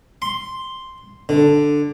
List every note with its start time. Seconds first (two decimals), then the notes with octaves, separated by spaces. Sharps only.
0.22 C6
1.29 D3